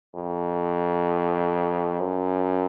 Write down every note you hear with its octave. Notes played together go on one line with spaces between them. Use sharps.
F2
F#2